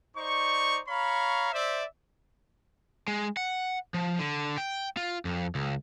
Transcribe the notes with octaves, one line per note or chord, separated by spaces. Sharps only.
D#4 C5 D5 C#6
C#5 F5 A#5 B5 C#6
C5 D5 E5
G#3
F#5
F3
D3
G5
F4
F2
C#2